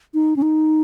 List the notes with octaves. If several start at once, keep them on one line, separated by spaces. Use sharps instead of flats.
D#4
C#4
D#4